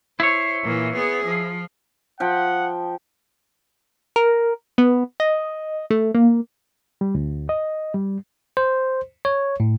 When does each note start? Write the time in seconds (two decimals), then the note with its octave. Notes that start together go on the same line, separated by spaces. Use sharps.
0.20 E4 C5 C#5
0.64 A#2 E3
0.95 B3 G#4
1.25 F3
2.20 F3 F#5 G5
4.16 A#4
4.78 B3
5.20 D#5
5.90 A3
6.15 A#3
7.01 G3
7.15 D2
7.49 D#5
7.94 G3
8.57 C5
9.25 C#5
9.60 A2